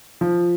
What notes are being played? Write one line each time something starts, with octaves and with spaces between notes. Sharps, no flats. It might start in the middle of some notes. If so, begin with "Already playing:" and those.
F3